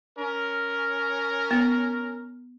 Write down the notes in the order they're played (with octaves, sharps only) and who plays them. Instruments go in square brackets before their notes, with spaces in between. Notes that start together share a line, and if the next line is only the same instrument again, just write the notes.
[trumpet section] C#4 A#4
[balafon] B3